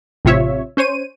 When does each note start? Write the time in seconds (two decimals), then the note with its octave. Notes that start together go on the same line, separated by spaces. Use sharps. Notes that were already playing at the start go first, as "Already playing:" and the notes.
0.25 A1 C3 F4 C#5 E5
0.77 C#4 C5 C#5 D#7